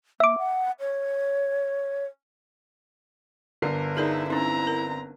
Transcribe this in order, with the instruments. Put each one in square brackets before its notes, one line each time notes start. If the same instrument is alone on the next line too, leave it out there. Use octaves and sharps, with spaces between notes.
[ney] A#3 [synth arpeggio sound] E5 D6
[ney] F#5
C#5
[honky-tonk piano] G1 D3 C7 [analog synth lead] A#4
[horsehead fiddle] D#4 [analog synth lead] E4 [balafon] G#4 A#4 D5
[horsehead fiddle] C4 A#5 [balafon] C#4 D#4
[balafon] A#4